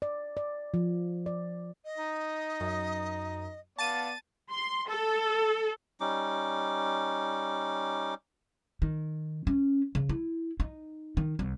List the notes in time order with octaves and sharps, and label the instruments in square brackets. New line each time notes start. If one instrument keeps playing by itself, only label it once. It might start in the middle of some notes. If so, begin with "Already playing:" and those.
[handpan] D5
D5
F3
D5
[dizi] D#5
[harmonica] D#4
[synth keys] F#2
[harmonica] B3 D5 [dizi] F5 [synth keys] A5 A6 D#7
[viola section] C6
A4
[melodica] G3 C#4 D#4 D6
[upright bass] D#3
C#4
C#3
E4
D#4
D#3
C2